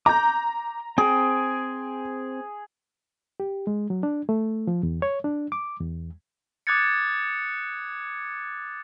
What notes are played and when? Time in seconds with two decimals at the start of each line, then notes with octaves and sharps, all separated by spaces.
0.06 A#5 D6 G6
0.98 C4 G#4 G5
3.40 G4
3.67 G#3
3.90 F#3
4.03 D4
4.29 A3
4.67 F3
4.83 E2
5.02 C#5
5.24 D4
5.52 D6
5.80 E2
6.67 D6 D#6 F#6 G#6 A6 C#7